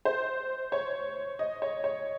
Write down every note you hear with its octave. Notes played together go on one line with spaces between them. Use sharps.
C5
C#5
D#5
C#5
C#5